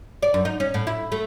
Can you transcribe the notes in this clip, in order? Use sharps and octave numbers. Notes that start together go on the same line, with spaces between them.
D5
F#2
D#4
C#4
A2
E4
A3